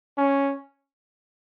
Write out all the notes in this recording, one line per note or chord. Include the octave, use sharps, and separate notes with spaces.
C#4